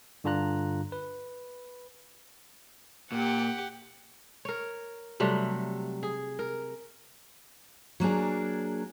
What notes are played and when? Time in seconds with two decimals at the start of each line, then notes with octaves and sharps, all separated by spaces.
0.24 G2 D3 D4 F4 A#5 F#6
0.92 B4
3.12 A#2 G4 F#5
4.45 A#4 C#5
5.20 C3 F#3 G3 A3
6.03 G#4
6.39 A#4
8.00 F#3 A#3 D4 G#4